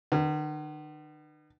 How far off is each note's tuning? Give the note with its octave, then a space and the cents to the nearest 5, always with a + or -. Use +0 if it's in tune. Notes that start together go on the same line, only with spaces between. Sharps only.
D#3 -45 B4 -15